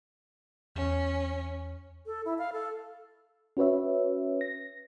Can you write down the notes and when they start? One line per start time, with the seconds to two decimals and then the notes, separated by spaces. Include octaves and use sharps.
0.76 E2 C#4
2.06 A4
2.25 E4
2.38 F5
2.52 A4
3.57 C#4 F#4 B4 C#5 E5
4.41 A#6